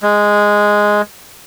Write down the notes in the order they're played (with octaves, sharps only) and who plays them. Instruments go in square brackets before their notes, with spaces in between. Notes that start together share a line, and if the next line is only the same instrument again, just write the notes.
[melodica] G#3